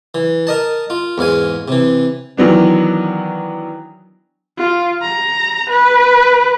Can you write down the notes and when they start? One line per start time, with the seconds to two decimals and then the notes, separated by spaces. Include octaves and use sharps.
0.14 E3
0.47 A#4 D#5 A5
0.90 F4
1.18 E2 G#2 F5 G#5
1.68 C3 E3
2.37 D#3 E3 F#3 B3 D4
4.58 F4
5.02 A#5
5.70 B4